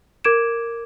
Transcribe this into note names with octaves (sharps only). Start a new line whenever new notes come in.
A#4 D6 G#6 D7 E7